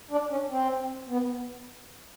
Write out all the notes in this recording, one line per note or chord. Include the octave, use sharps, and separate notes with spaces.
D4
C#4
C4
B3